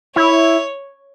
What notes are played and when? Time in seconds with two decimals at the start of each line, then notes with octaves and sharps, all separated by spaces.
0.16 E4 C#5